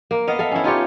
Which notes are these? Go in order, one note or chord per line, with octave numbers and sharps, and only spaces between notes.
A#3
B3 D#5 F5
A4 E5 F5
C#4 E4
D#4 F4 G4 C#5